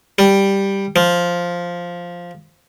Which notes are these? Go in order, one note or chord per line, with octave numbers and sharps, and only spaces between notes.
G3
F3